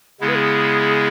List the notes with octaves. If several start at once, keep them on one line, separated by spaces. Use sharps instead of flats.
C#3 G#3 B3 E4 G#4
B4
G#4